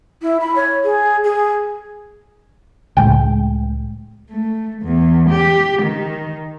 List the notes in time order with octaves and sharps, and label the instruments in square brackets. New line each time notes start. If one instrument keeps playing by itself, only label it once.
[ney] E4
B5
C#5
G#4
G#4
[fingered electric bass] C#2 A2 G#3 [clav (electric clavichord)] G5
[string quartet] A3
E2
G4
D#3